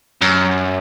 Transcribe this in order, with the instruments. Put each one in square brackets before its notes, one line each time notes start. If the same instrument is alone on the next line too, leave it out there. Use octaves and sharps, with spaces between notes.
[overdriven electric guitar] F#2